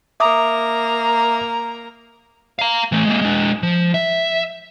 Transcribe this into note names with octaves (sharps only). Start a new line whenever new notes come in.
A#3 E5 A#5 D6 D#6
F5 A#5
E3 A3
G#3 A#3
G#3 D4
F3
E5